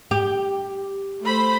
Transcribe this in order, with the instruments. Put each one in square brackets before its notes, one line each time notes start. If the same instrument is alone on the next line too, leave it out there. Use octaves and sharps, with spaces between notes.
[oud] G4
[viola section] A3 C5 B5